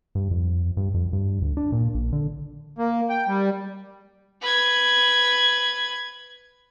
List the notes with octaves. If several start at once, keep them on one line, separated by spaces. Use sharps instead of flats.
G2
F2
G2
F2
G2
D2
D4
A#2
A#1
D3
A#3
G5
G3
B4 G#6